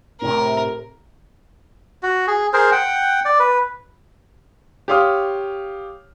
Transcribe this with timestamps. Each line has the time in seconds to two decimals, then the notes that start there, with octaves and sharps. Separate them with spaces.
0.22 A2 C3 A#4
2.03 F#4
2.27 G#4
2.53 G#4 A#4 C5
2.72 F#5 G5
3.25 D5
3.39 B4
4.88 G4 C#5 F5 C6 D#6 F6